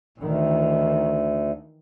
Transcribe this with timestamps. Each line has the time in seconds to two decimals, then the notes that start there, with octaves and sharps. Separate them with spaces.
0.18 D2 D#3 E3